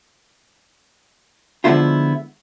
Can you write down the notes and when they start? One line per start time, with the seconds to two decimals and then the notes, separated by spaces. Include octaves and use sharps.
1.64 D3 F3 G#3 B3 E4 F4